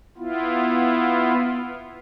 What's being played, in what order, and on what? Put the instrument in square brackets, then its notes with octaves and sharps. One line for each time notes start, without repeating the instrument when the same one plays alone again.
[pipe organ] B3 E4 F4